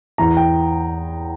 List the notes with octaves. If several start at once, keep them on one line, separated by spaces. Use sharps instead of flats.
E2 E3 A#5
G5